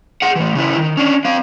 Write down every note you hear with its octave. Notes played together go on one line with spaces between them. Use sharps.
G#4 F#5
A2 E3
C#3 E4
D#3
C#4 D4
C4 F5